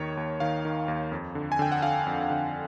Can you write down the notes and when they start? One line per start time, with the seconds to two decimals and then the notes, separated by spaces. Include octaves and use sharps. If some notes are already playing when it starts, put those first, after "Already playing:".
Already playing: D#2 D#3 C#5
0.17 D#2
0.40 D#3 F5
0.65 D#3
0.88 D#2
1.12 F2
1.35 D3
1.52 G#5
1.59 D3 G5
1.72 F#5
1.82 D3 F5
2.06 F2
2.30 D3